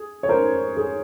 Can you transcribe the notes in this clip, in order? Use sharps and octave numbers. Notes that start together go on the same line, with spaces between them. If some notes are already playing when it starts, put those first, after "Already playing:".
Already playing: G#4
C#5
A#4 C5
G#4